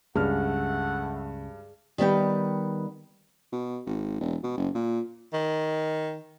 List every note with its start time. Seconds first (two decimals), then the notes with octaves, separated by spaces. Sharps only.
0.16 C#2 G2 A3 E4 G#4 F#5 F6
1.98 D#3 G3 B3 G5
3.52 B2
3.86 G#1
4.20 E1
4.43 B2
4.57 F#1
4.75 A#2
5.33 D#3